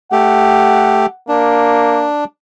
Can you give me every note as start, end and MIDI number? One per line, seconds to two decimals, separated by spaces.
0.12 1.06 57
0.12 1.06 67
0.12 1.19 78
1.29 2.08 58
1.29 2.24 62